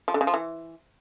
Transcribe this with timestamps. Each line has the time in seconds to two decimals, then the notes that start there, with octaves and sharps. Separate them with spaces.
0.08 F3
0.14 D3
0.21 C#3
0.27 F3
0.34 E3